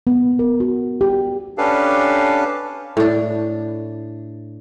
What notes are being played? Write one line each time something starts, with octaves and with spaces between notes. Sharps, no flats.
B3
A#4
F#4
G4
C#4 D4 G4 A4 B4 F5
A2 D4